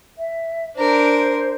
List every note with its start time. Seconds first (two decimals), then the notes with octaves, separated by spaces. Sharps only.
0.18 E5
0.76 D4 A#4 C5